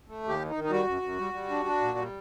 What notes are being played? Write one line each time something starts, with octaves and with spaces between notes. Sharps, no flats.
A3
D#2 G4
D#3
D#4
D#3
D#4
G3 F#4
F#2
F#2
G3
G3
D4
D4
A#2
G3